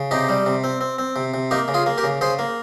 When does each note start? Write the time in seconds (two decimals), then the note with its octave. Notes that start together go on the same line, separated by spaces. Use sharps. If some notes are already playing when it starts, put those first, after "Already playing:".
Already playing: C#3
0.11 C3 D#4 G4
0.29 G3
0.46 C3
0.64 C4
0.81 C4
0.98 C4
1.16 C3
1.34 C3
1.51 A#3 D#4 G4
1.68 C#3
1.74 F4 G#4
1.86 A#3
1.98 G4 A#4
2.04 C#3
2.21 C#3 G#4 C5
2.39 A#3